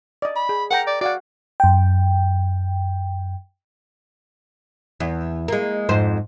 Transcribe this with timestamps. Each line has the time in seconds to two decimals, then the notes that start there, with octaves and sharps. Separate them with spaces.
0.22 D5 D#5
0.36 B5
0.49 G#4
0.71 A#4 F#5 G5 A#5
0.87 D5
1.01 F#4 D5 F5 F#5
1.60 F#2 G5
5.00 E2
5.48 G#3 A#3
5.89 F2 G#2 C5